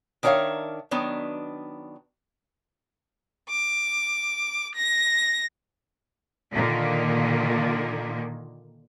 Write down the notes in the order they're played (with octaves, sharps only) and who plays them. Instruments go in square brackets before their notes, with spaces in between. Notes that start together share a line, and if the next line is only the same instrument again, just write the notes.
[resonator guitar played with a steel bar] D#3 D4 A#4 C#5 E5 F5
D#3 F#3 B3 D4
[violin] D6
A#6
[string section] A#2 D3 D#3 A#3